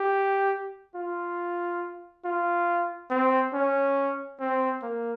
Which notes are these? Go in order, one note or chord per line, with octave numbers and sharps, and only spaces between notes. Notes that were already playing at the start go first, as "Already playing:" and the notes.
Already playing: G4
F4
F4
C4
C#4
C4
A#3